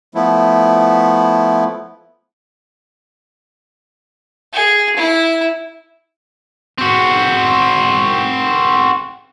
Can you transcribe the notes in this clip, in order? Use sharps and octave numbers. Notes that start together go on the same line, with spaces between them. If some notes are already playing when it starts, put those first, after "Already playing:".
F3 A3 B3 E4
G#4
E4
C4 F#4